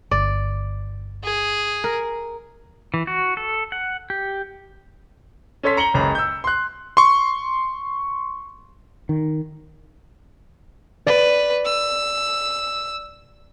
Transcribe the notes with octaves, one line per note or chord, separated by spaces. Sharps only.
G1 D5
G#4
A#4
E3
F#4
A4
F#5
G4
C#4 A4 C#5 C6 B6
A#5 C#7 F#7 G7
F#1 C#2 C#4 A#5 B5
E6 G6
C6 F#6
C6 C#6
D#3
B4 D5
E6